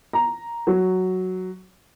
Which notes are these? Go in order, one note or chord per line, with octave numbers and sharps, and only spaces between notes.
A#5
F#3